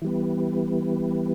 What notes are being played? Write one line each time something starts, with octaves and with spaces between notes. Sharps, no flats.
E3 G3 B3